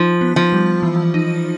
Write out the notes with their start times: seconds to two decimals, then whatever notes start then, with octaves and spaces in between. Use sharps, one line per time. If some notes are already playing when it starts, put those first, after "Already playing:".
Already playing: F3 D#4
0.21 B3
0.36 F3
0.52 G3
0.83 E3
1.14 D#4